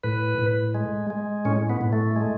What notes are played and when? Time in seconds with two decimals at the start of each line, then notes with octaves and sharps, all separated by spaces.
0.03 A2 B4
0.39 A2
0.74 G#3
1.10 G#3
1.45 A2 C#4
1.70 B3
1.81 A2
1.93 A3
2.16 G#3